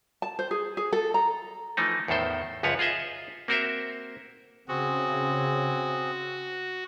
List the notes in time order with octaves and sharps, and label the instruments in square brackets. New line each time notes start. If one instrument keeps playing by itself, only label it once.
[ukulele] A5
C5
G#4
G#4
A4
A#5
[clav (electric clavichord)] E3 F3 A3 D#4
E2 A2 D#3 A4 C5
C#2 F#2 F3 B4 C#5 F#5
F4 G#4 D#5 E5
A#3 C4 F#4 A#4 C5 E5
[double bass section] C#3 [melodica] C4 G#4 [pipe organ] F#4